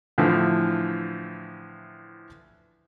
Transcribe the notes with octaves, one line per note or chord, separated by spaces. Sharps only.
A2 D3 E3 F3